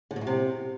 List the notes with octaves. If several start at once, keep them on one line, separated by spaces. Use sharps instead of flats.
D3
B2
A2
C3